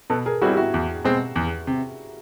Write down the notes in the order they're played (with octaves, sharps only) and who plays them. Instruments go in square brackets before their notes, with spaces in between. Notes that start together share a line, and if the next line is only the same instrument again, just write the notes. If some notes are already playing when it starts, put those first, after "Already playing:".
[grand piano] B2 [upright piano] A4 B4
[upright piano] G#4 A#4
[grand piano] G3 C4 E4 [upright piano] F#4 G#4
[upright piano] G4
E4 F#4
[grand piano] E2
B2 G#3 C4
E2
C3